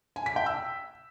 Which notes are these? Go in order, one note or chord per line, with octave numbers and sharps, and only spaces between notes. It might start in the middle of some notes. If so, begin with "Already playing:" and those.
G#5
B6
G5
E6